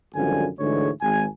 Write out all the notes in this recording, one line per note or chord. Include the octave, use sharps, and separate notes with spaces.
G#1 F#2 D3 F3 G3 G#5
D2 G#2 D3 E3 G#3 C#5
G#1 G#5